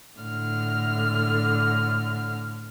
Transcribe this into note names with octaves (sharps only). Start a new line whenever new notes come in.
A2 D3 F6